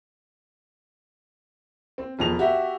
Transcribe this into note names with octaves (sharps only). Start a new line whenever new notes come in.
C4
E1 F2 F7
F#4 G4 E5